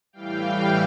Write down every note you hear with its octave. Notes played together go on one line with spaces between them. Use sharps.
A2 E3 G3 F5 G5